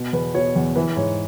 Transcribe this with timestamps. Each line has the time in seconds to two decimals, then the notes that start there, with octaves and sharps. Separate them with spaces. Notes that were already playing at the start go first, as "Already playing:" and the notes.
Already playing: B2
0.13 E2 B4
0.34 B2 C#5
0.56 E2
0.76 E3 B4
0.97 G#2 C#5